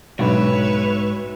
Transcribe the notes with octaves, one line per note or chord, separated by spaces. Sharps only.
B1 G#2 B4 C#5 E5